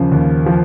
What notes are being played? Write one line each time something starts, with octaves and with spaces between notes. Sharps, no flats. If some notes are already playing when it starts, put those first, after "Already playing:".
Already playing: D#2 C#3 F3
D#2
F3